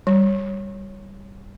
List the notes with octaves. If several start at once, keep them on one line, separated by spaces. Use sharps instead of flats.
G3